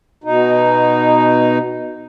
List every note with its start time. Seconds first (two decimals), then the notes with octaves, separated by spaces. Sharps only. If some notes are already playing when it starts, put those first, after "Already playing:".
0.24 B2 D#4